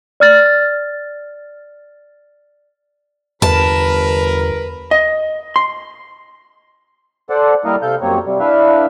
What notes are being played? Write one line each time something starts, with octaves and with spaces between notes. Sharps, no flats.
D5 F6 A6
G1 E2 A#4 B4 A5
D#5
C6
A4 C5 D5 F#5
G3 A#3 E4 A#4 D#5 F5
C3 A4 F5 G6
F#2 G3 A#3 C4 C#5
C3 G3
D4 E4 B4 E5 F5